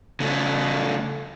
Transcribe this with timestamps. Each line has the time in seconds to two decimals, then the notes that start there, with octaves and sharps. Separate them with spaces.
0.20 C#3 A3